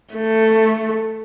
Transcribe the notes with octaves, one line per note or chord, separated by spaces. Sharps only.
A3